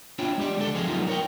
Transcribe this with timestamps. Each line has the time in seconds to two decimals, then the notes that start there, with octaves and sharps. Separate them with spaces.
0.19 D4 E4 F4 C#5 G5
0.38 G#3 G4 D5
0.58 C#2 D3 A4
0.74 F3 G#3 C4 F4 G#4 D#5
0.88 F#3 G3 A3 B3 D#4 F4
1.08 A#4 C#5 G5